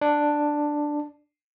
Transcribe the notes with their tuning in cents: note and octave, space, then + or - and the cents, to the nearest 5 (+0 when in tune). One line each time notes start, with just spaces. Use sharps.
D4 +5